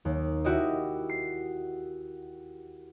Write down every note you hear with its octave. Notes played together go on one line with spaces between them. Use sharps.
D#2
E4 F#4 G4 D#5
C7